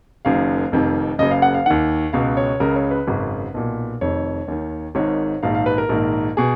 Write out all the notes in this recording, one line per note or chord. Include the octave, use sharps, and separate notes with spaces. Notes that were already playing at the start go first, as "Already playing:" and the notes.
F#1 F#2 D#3 F5
F1 F2 D#3
F#1 F#2 C#3 D#5
F5
F#5
F5
D#2 D#3 F#5
C#2 B2 F5
C#5
C#2 C#3 A#4
C#5
B4
G#1 F#2 C#3
B1 A#2
F1 F2 D#3 C#5
D#2 D#3
G#1 G#2 D#3 C#5
A#1 G#2 D#3 F5
F5
B4
A#4
A#1 G#2 D#3
B2 G#4